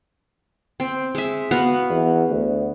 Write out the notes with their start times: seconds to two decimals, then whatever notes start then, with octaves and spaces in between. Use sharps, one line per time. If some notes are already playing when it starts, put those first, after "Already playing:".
0.80 C4
1.15 G#3 E5
1.51 B3 F#4 F5
1.90 E2
2.30 D2